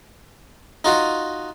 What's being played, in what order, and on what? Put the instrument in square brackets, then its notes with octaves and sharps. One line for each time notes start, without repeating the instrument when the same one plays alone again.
[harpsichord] D#4 F4 F#4